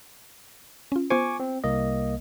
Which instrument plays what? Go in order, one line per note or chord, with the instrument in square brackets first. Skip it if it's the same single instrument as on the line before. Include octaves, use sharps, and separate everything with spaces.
[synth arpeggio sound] C#4 F4
[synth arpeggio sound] B3 F4 C5 [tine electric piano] G#5 C#6 D6
[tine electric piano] C4
C2 A#3 D#5